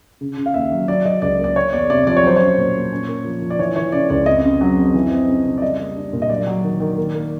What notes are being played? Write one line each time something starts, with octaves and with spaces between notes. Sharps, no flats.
C#3
C#3
F5
D#2 E5
F#3
F#3 D5
F#3 D#5
C#2 D5
A#3
D5
A#3 C#5
E2 D5
C3 D5
F3 D5
C#5
F#3 C5
C#4 C#5
A#2
A#2
C#4
A#3
F3
F3
D5
E3 C#5
E3 C#5
C#3 D5
C#2 D5
F2 D#5
C#3
F#3
F2
E3
C4
C#3
C#3
D5
G3 D#5
A#3
D4
A#2
D#5
F#3 D5
F#3
D#3
D#3
A#3
A#3